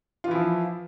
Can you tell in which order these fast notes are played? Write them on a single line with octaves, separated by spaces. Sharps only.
F4 E3 E4 F3